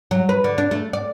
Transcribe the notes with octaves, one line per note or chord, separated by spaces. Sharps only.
F#3
B4
D3
D4
A3
D5